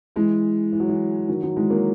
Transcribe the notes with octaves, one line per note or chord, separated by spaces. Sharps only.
E3 G#3
E3
F#3
E3
D#3 F#3
D#3 F#3
E3 G#3
F#3 A#3